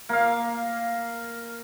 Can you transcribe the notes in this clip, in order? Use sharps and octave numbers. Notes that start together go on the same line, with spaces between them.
A#3 F5